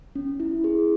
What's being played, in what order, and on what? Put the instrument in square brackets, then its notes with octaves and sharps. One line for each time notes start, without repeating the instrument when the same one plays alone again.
[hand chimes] C#4
E4
G#4